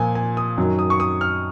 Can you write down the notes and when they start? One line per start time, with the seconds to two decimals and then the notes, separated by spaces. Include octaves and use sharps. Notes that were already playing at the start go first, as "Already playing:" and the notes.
Already playing: A#2 F3 G#5
0.15 G#5
0.37 D#6
0.58 F#2 D#3 F#3
0.79 D#6
0.90 C#6
1.00 D#6
1.21 F6